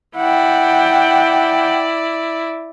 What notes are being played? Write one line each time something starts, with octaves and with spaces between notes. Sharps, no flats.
E4 D5 F#5 G5